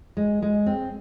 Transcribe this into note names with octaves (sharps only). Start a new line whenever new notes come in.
G#3
G#3
C4